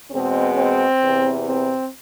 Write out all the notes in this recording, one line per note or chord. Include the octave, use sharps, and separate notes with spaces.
E2 B2 G#3 C4
C4
E2 C3 E3
C4